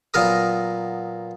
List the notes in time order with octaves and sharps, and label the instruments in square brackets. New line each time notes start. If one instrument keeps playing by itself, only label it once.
[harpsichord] A#2 F#3 B3 A#4 A#5 D#6